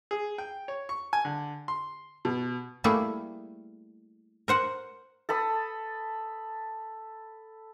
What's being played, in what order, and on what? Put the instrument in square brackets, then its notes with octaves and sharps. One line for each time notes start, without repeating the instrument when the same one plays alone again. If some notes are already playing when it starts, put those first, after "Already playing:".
[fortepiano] G#4
G5
C#5
C#6
G#5
D3
C6
B2
[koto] G3 A3 A#3 E4 G#4
A#4 C5 F#5
[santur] A4 A5 B5 D#6